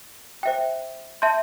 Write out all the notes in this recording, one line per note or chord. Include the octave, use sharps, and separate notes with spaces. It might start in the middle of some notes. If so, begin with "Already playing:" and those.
C5 E5 G5
E5 A5 C6 G6